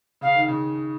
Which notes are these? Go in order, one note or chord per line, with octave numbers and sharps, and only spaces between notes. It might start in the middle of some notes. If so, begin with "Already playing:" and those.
C#3 F5
D#3
C#3